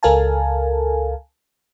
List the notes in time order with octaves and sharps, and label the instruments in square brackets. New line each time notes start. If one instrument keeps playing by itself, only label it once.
[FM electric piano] C#2 A4 A#4 F5 G#5 A5